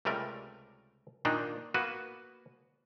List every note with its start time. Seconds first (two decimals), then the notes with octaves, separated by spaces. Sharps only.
0.05 C#2 C3 G3 A3 A#4
1.25 A#2 D#3 A#3 D4 D#4
1.74 A#3 B3 F#4 B4